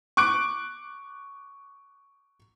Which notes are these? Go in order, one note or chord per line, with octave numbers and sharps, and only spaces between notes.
C#6 D6 F#6 D7